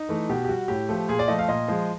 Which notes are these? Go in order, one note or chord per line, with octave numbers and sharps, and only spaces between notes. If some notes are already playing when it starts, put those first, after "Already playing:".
Already playing: D#4
E3 A3
B2 G4
G4
G3 F#4
A2 G4
F3 A3
A#2 G#4
D5
F3 A3 D#5
F5
A#2 D#5
F3 G#3